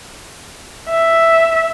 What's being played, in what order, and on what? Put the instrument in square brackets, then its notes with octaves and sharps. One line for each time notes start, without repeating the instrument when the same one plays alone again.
[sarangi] E5